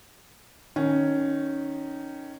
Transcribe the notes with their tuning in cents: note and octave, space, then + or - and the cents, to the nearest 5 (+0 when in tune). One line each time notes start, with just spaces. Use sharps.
D#3 -10 C#4 +0